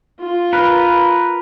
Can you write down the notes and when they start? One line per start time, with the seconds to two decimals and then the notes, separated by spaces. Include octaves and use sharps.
0.20 F4
0.53 A#4 B4